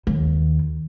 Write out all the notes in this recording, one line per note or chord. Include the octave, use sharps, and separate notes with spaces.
D#2